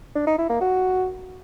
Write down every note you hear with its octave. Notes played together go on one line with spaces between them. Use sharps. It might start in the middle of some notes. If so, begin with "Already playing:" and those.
D4
D#4
E4
A#3
F#4